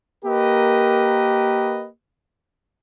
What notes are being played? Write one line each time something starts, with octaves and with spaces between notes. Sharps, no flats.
A#3 G4 A#4 B4 D#5